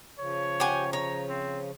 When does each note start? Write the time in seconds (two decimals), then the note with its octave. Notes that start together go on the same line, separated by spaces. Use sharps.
0.19 C#3 F3 C#5
0.60 G4 F#5 G#5
0.93 C#5 A#5
1.29 C4